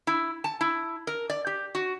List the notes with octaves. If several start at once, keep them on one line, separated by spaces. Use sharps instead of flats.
E4
A5
E4
A#4
D5
G4
F#4